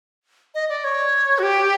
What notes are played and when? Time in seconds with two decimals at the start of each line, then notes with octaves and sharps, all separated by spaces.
0.55 D#5
0.69 D5
0.84 C#5
1.39 F#4
1.43 G4